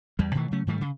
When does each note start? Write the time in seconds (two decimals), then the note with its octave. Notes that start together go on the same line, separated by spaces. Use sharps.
0.19 E2 G3
0.35 B2 D#3 E3 A3
0.51 C#3 F#3 A3 C#4
0.67 G#2 D#3 G3 A3
0.81 C#3